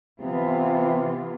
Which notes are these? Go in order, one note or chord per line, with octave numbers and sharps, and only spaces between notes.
C3 E3 B3 F4